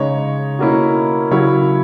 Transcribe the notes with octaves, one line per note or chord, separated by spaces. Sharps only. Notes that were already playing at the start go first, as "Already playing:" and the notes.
Already playing: C#3 G#3 D#4 C#5
B2 A#3 C#4 E4
C#3 F#3 C#4 E4 C#5